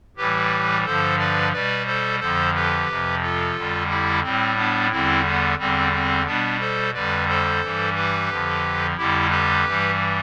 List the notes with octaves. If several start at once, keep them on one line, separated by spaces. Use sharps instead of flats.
A2 E3 G3 G4 B4
G2 D3 F3 A4 C5
B4 D5
B2 G3 B4 D5
A4 C5
F2 D3 F3 A4 C5
G4 B4
F2 C3 F3
F4 A4
F2 D3 G3
E4 G4
A2 G3 C4
B3 D4
E2 D3 G3 C4 E4
B3
E2 D3 G3 C4
C4
B2 G3 B3 D4
A4 C5
F2 D3 G3 B4 D5
A4 C5
G2 E3 G3
G4 B4
F2 D3 F3
F2 D3 G3 E4 G4
G4 B4
G2 E3 G3